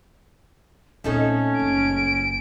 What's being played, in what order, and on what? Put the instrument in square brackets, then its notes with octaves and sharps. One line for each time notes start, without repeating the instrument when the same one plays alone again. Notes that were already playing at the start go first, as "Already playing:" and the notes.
[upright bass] A#2 C4 [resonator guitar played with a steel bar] A3 D#4 A4 [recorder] C#4
[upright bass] F#1 [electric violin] D7